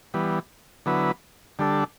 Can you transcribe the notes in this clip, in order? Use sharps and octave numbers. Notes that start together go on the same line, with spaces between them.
E3 G3 B3
D3 F#3 B3 E4 B4
D3 G3 D4 A4